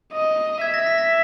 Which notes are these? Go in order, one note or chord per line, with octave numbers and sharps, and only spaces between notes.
D#5
E5 G#6
A#6
B6
A#6